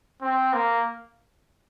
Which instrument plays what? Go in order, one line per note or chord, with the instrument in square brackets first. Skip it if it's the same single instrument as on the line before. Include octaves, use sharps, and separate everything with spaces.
[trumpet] C4
A#3